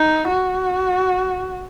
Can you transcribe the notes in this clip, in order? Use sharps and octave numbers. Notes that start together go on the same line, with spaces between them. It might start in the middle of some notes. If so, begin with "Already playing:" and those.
Already playing: D#4
F#4